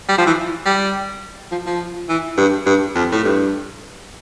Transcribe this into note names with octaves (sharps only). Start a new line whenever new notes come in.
G3
F3
E3
G3
F3
F3
E3
G2
G2
F2
A2
G2